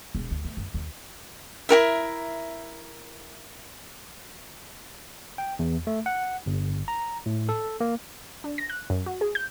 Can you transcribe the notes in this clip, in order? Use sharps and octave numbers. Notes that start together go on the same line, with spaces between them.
E1
D2
A3
F#2
D#2
E4 F#4 A#4 E5
G5
E2
A3
F#5
G1
A#5
A2
A4
A#3
D4
A#6
F#6
F#2
F#4
G#4
G6